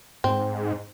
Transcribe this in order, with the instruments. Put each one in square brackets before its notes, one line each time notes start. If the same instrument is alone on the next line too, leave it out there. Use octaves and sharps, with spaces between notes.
[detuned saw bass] G#2 [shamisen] C4